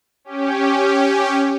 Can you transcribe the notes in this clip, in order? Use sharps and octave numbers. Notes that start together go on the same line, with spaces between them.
C#4 G4